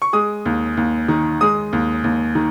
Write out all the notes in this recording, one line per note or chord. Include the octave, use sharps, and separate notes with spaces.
C#6
G#3 D#6
D#2
D#2
D#3
G#3 D#6
D#2
D#2
D#3